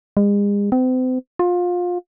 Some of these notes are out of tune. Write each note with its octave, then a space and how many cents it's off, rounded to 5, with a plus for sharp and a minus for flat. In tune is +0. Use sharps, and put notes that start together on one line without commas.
G#3 -40
C4 -40
F4 +25